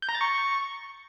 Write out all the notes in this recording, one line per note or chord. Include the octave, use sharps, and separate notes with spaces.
G6
A#5
A6
C#6